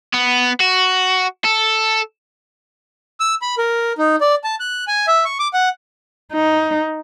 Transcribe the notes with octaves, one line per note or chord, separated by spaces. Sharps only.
B3
F#4
A4
E6
B5
A#4
D#4
D5
A5
F#6
G#5
E5
C#6
D6
F#5
D#4